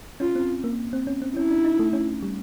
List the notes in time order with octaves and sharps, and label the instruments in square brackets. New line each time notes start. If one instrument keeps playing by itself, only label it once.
[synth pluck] C#4 [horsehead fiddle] F4
[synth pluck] C4
A#3
C4
C#4
C4
[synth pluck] C#4 [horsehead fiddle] E4
[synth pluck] D4
D#4
A3
C#4
G3